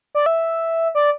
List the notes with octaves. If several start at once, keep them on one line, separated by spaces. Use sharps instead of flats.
D5
E5
D5